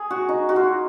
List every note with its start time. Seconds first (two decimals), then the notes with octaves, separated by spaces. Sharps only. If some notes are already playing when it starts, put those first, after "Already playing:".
Already playing: G#4
0.11 F#4
0.29 D#4
0.49 F#4
0.56 F4